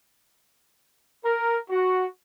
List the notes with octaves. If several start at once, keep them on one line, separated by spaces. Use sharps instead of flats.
A#4
F#4